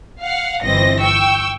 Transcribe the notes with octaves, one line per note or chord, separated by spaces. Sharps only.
F5 F#5
G1 E3 C4 D#5 A#6
G5 C#6 E6